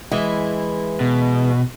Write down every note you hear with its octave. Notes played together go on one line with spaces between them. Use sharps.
E3 G#3 E4
B2